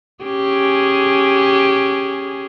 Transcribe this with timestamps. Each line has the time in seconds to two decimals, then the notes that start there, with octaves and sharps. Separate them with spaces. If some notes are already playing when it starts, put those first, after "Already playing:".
0.24 C#4 G4 G#4